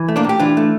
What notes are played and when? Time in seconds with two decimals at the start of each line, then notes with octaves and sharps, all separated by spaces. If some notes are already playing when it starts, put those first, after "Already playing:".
Already playing: E3
0.08 A3
0.16 A#3 D4
0.24 A2
0.29 G4
0.39 E3 D4 F4
0.57 A3